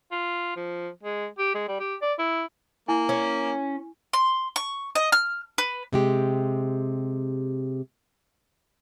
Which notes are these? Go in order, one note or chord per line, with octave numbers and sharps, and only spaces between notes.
F4
F3
G#3
G4
G#3
G3
G4
D5
E4
A#3 E4 G#5
C#4
C6
C#6
D#5
F6
B4
C3 G#3 G4